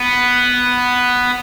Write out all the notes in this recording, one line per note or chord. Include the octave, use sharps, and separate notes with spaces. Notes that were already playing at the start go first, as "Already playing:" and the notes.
Already playing: B3